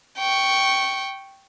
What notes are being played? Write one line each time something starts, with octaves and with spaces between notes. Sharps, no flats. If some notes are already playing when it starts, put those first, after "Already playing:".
G5 C#6